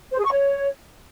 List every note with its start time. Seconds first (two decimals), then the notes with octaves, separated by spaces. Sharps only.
0.12 C5
0.18 G#4
0.25 C#6
0.31 C#5